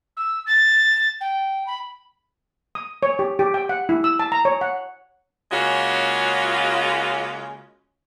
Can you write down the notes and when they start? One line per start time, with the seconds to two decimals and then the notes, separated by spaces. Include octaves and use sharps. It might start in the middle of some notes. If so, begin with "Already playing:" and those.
0.17 E6
0.47 A6
1.21 G5
1.67 B5
2.75 D#6
3.03 C#5
3.19 G4
3.39 G4
3.54 G5
3.69 F#5
3.89 E4
4.04 E6
4.19 A5
4.32 A#5
4.45 C#5
4.61 F#5
5.51 C#3 G#3 A#3 C#4 F4 F#4